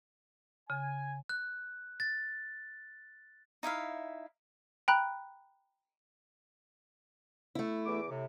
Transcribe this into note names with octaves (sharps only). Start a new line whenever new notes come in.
C#3 G#5
F#6
A6
D#4 E4 E5 F5
G5 A#5 B5 F#6
A3 E4
E2 D6
A2 C3